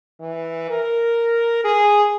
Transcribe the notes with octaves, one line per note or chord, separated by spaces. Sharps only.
E3
A#4
G#4